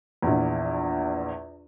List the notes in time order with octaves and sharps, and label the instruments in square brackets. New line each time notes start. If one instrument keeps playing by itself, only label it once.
[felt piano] A#1 E2